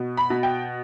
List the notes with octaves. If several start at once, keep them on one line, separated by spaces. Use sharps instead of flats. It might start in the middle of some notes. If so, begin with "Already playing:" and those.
Already playing: B2
B5
B2
G5